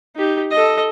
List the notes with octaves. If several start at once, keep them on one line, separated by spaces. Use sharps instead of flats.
D#4 G4
A4 D#5